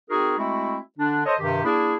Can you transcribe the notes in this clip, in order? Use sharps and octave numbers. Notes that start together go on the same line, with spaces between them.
C4 D#4 F#4 G#4 A#4
G#3 A3 C4 E4 F#4
D3 D4
A4 C5 C#5 D#5
G2 C3 D#3 G4
A#3 D4 E4 G#4